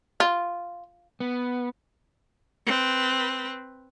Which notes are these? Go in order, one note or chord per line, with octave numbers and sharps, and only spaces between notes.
F4
B3
C4 B4